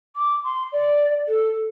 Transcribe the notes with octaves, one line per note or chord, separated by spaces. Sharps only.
D6
C6
D5
A4